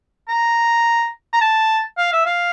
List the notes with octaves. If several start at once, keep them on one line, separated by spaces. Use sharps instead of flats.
A#5
A#5
A5
F5
E5
F5